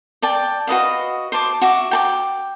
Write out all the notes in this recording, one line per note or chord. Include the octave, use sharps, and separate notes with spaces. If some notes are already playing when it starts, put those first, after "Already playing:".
D5 G5 A5
F#4 B4 D#5 F5
C5 A5 D6
F#4 E5 D6
G5 A5 D6